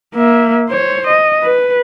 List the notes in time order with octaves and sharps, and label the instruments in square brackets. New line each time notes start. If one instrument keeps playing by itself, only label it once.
[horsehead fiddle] A#3 E5
C5 C#5
D#5
B4